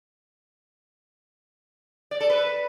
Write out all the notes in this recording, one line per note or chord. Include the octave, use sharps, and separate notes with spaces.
D5
A4
B4